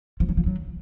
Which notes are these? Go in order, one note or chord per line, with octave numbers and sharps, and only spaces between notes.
F3
F#3
F3
F#3